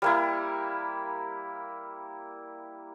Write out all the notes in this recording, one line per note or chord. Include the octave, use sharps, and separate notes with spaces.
G3 A#3 E4